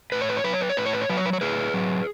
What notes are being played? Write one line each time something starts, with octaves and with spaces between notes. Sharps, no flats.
A2 B4
C#5
B4
C#5
F#3 B4
C#5
B4
C#5
A2 B4
C#5
B4
C#5
F#3 B4
C#5
B4
C#5
A2 G#4 B4
F#3